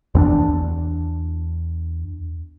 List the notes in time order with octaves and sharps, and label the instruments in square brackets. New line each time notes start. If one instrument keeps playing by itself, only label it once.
[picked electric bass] E2 C4 D4